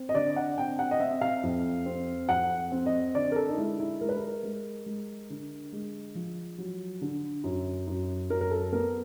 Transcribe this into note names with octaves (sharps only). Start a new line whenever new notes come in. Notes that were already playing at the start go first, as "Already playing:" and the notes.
Already playing: C4
D#5
D3 D5
F#5
C4 G5
F#5
D#5
C4 E5
F5
F2
C4
F2 F#5
C4
D#5
D3 D5
A#4
A4
D#4
G#3 E4
E4
G#3 A#4
B4
A#4
G#3
G#3
D3
G#3
F3
F#3
D3
F#2
F#2
F#2 A#4
A#4
A4
B3 A#4